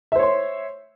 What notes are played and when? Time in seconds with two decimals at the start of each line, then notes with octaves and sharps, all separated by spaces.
0.12 E5
0.16 C5
0.19 C#5
0.23 C6